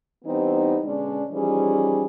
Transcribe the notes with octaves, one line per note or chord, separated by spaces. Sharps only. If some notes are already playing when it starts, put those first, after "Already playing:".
E3 G3 B3 C4 D#4
B2 D3 G#3 C#4 D4
E3 F3 G3 C#4 D#4 G#4